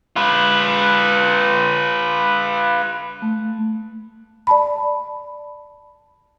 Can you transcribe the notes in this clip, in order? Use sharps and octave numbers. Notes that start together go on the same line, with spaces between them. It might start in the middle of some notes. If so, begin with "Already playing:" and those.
F4 B4
A3
D5 A5 B5